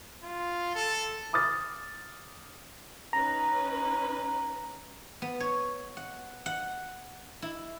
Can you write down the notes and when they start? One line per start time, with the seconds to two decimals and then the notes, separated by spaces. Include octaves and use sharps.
0.24 F4
0.75 A4
1.33 D6 D#6 F6 A6
3.13 C#4 D#4 B4 A#5
5.22 B3
5.40 C#5
5.97 F#5
6.46 F#5
7.42 E4